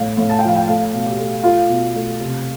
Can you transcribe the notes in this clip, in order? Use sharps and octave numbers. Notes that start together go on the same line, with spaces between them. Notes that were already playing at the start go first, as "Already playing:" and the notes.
Already playing: A2 F5
A2
A5
G5
F3 F5
G5
A3 F5
B2
G4
A3
A3 F4
B2
A3
C3